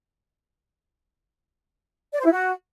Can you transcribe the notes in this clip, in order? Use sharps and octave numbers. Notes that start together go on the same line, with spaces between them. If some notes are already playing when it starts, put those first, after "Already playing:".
D5
C5
E4
F#4